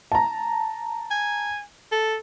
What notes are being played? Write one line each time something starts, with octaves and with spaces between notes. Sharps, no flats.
A5 A#5
G#5
A4